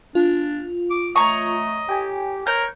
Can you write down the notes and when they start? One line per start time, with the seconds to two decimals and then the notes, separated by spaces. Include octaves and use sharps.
0.15 D4 F4
0.90 D6
1.16 A3 C#5 D#5 A#5 C#6
1.89 G4 G5 G#5
2.47 A#4 C#5 G6